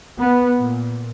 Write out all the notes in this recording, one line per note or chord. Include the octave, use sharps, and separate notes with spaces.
B3
A#2